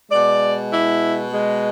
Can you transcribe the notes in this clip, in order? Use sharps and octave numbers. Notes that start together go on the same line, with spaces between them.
B2 G#3 D5
E4
G#3